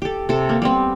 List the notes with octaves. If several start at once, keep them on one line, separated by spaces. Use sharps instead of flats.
G4 A4
C3 A4
A#3
G3 B3 C4